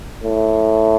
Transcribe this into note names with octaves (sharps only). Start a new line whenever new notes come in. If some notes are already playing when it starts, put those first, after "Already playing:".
A2